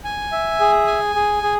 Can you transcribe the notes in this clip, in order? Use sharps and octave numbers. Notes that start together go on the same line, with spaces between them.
G#5
E5
G#4
G#5
G#4
G#4